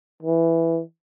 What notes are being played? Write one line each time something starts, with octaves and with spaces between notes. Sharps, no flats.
E3